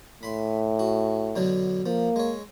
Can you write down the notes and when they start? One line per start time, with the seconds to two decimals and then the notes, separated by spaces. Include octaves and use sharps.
0.23 A2 B5 C6
0.79 F#4
1.36 B2 D3 F#3
1.86 F3 A#3
2.16 G#3 C#5